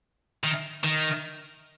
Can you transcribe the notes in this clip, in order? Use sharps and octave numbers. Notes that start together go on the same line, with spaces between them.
D#3
D#3